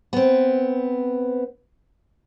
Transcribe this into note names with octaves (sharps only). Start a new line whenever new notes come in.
B3 C4